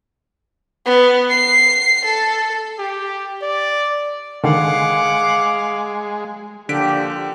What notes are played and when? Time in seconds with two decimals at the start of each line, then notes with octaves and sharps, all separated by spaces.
0.86 B3
1.30 C7
2.05 A4
2.79 G4
3.42 D5
4.44 D3 D#3 G#3 F5 F#5 D6
6.69 A#2 D3 F3 G4 B6 D7